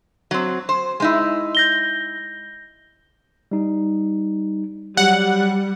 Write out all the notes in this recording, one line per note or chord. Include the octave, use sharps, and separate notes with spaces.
F#3 C4
C5
G#3 D#4 E4
G6 A#6 G7
G3 D#4
F#3 G3 F#5